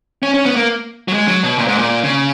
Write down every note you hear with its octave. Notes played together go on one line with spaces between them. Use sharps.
C#4
C#4
B3
A#3
F#3
G#3
F#3
B2
A#2
G#2
A#2
C#3